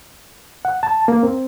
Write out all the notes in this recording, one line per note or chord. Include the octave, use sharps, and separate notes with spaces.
F#5
A5
A#3
C4